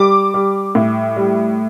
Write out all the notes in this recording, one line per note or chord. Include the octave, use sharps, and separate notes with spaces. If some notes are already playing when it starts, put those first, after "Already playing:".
Already playing: G3 D6
G3
A2
G3